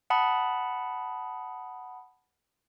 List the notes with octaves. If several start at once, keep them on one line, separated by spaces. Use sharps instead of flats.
F#5 A5 B5 D#6